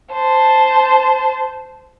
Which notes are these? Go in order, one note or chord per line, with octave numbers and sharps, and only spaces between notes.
C5 A5